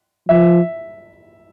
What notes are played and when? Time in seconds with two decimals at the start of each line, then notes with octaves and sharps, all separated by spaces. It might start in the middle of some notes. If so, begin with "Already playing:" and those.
0.29 F3 E5